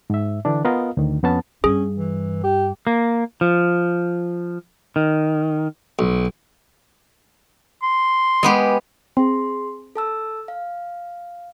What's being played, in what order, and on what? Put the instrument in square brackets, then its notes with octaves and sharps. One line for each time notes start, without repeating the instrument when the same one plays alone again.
[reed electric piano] G#2 E5
D3 E3 D4
B3 F4 A#4 D#5 F5
D2 D#3
F2 B3 C#4 A5
[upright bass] G2 [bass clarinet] C#4 [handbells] G#4
[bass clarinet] E3
G4
[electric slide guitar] A#3
F3
D#3
[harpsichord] B1
[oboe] C6
[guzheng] G#3 B3 G4
[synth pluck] C4 [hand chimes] G#4 C6
[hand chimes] A4 A5 E6
F5